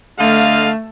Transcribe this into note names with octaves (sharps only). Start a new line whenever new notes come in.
D3 A3 D#5 F5